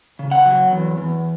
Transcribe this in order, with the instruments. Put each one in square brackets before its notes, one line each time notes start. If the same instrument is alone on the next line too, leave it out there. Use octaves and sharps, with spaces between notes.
[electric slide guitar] C#3
F#5
F#3
E2
E2